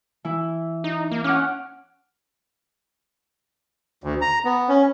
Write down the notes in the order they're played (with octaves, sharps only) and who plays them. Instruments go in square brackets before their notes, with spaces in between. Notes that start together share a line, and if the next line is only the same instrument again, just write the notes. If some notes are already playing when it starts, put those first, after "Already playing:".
[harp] E3 E4
[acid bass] D#4
A#3
[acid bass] C#4 [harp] F#5 D6 F6
[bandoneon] D2
A#5
B3
C#4